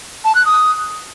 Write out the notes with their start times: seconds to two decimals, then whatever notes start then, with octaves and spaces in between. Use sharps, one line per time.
0.25 A5
0.35 F#6
0.45 D#6